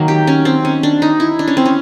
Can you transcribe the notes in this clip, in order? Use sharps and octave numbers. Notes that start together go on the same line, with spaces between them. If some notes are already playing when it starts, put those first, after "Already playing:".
Already playing: D#3 F#3 A#3
G4
C#4
C4
C#4
D4
D#4
E4
D4
C#4
C4
C#4